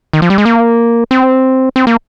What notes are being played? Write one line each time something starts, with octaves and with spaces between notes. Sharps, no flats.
D#3
F3
G3
G#3
A#3
C4
C4
A#3